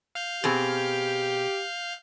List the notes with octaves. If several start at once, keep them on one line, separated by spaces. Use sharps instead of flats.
F5 F6 G6
B2 C4 G4 G#4